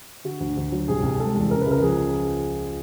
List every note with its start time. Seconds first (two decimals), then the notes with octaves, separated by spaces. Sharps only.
0.24 D3 F#4
0.40 D2
0.57 D2
0.72 F#3
0.88 C2 G#4
1.03 C2
1.19 G#3 A4
1.35 E2
1.51 C#3 A#4
1.61 B4
1.66 C#2 A#4
1.82 F3 G#4